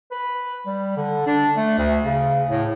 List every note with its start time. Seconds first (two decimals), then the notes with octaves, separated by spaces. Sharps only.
0.11 B4
0.66 G3
0.97 D3
1.27 D4
1.57 A3
1.78 D2
2.05 C#3
2.50 A2